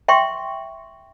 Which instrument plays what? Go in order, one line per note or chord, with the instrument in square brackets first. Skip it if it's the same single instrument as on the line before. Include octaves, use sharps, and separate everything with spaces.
[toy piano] E5 G5 C6 C#6